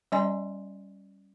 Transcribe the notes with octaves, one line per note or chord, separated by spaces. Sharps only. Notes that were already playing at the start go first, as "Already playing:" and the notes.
G3 C#4 D5 D#5 G#5 C6